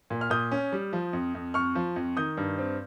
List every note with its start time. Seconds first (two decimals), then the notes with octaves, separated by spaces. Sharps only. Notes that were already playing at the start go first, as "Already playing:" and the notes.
0.10 A#2
0.21 F6
0.30 A#2 D#6 G6
0.52 C#4
0.72 G3
0.93 F3
1.13 F2
1.35 F2
1.54 F2 C#6 F6
1.75 F3
1.96 F2
2.17 D#3 D#6 G6
2.37 G2
2.59 C4